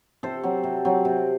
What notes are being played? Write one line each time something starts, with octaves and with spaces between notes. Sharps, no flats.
C3 A4 C5
F#3 C4
C3
F#3 C4
C3